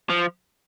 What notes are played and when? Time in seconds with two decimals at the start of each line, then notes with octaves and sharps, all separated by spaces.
0.10 F3